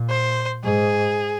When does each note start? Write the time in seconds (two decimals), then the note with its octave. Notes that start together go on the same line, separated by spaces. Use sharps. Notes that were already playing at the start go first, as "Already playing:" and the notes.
Already playing: A#2
0.09 C5
0.63 G#2 G#4